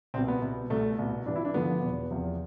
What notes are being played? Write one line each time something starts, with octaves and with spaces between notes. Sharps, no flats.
C2 B2 C4
B3
C2 B2
C2 B2 A3
C2 B2
G2 E3 D4
E4
D4
G2 D3 F3 B3
E2 B2
E2 C3 F3